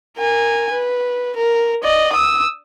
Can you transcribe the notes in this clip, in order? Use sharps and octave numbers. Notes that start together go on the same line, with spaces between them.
A#4 G#5
B4
A#4
D5 D#5
D#6 E6